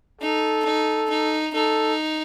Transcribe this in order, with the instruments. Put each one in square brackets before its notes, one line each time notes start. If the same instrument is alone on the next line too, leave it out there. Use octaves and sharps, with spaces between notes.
[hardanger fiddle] D#4 [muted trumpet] A4
[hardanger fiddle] D#4
D#4
[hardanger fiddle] D#4 [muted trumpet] A4